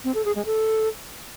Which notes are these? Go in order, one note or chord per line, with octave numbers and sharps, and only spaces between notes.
C4
A4
G#4
G#3
A4